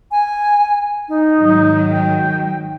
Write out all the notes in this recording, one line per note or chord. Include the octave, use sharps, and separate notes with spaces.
G#5
D#4
G#2 D#3 F#3
G5